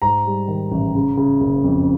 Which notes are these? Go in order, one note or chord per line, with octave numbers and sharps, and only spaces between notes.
G#2 A#5
G3
D#3
A1
C#3
C#3
F#1
F2